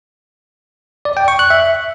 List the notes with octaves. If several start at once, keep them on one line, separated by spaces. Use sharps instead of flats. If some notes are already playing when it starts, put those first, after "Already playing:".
D5
G5
C#6
F#6
E5